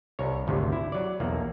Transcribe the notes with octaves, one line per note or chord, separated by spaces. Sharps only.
C2 C#5
G#1 D2 C3
E4
F#3 D5
B1 E2 A#3